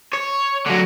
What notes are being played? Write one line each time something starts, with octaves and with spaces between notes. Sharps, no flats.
C#5
D3 F#3